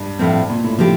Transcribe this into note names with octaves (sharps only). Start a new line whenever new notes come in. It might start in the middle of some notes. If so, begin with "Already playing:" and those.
Already playing: G2
A2 F3 C4
A#2
A2
A2 F3 C4 G4